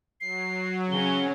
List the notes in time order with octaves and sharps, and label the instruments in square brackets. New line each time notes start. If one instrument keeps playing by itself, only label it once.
[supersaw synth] F#3 [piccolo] C7
[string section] C#3 C#4 [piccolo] G7